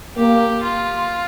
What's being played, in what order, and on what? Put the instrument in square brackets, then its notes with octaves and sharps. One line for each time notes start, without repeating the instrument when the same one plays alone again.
[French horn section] A#3 [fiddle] G4
[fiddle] F4